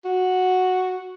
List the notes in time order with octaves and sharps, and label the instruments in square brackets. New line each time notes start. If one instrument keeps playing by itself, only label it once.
[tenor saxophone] F#4